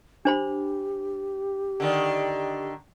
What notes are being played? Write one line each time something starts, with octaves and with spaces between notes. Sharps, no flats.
D4 G4 C5 B5
D3 D#3